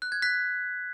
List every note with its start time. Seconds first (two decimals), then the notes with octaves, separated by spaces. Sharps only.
0.02 F#6
0.12 G#6
0.22 F#6 B6